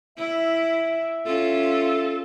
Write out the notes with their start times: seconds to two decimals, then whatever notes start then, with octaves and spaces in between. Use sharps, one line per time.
0.18 E4 E5
1.26 C#4 F4 A4